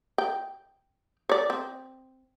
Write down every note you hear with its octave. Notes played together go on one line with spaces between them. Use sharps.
G5
C#5 D5
C4